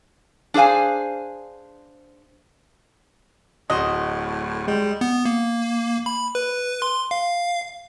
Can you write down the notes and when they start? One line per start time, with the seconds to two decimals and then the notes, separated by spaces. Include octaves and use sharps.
0.54 D4 G#4 C5 F5 G#5
3.70 D1 A2 F#4 D#5 C6
4.68 G3 G#3
5.01 B3
5.25 A#3
6.06 B5
6.35 B4
6.82 C6
7.11 F5